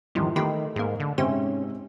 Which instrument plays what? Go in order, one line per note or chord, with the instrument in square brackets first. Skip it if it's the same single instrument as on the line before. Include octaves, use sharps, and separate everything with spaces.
[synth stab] F2 G#2 G3 [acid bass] D#3 [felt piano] E3 F4 C6
[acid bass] D#3 [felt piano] A3 [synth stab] G4 B4 C6
[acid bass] G#2 [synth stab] G#3 A#3
[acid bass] D3
[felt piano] G#2 C3 E5 [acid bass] C#4 [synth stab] G4 C5